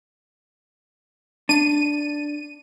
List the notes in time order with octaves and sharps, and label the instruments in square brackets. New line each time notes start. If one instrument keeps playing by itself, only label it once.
[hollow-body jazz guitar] D4 [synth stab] D#7